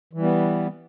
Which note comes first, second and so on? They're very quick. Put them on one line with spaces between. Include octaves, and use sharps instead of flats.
E3 G3 B3